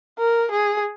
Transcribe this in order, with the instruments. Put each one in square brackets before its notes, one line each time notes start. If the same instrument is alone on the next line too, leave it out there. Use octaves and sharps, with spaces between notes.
[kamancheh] A#4
G#4